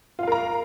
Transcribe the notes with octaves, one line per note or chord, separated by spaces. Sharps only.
F4 A#4 F5 A#5